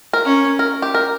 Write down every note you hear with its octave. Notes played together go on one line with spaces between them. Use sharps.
A#4
C#4
A#4
G4
A#4